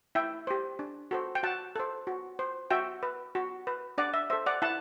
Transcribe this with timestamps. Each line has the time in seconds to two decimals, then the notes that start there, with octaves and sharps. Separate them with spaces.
0.15 E4 E5 G5
0.47 G4 C5
0.79 D4
1.11 F#4 A4 C5
1.35 G5
1.43 F#4 F#5 A5
1.76 A4 C5
2.07 F#4
2.39 C5
2.71 F#4 E5 G5
3.03 B4
3.35 F#4
3.67 B4
3.98 D4 D5 F#5
4.14 E5
4.30 A4 C5 E5
4.46 D5 F#5
4.62 E4 F#5 A5